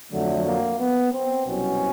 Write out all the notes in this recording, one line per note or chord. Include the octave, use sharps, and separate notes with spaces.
F2 D3 F#3 A3
A#3
B3
C4
C2 B2 F#3 C#4